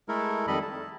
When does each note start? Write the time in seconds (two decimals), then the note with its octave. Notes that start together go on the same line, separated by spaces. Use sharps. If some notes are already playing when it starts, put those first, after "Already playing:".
0.09 G#3 A3 E4 A4 A#4
0.48 F2 D#3 G3 A4 D#5 B5
0.62 A5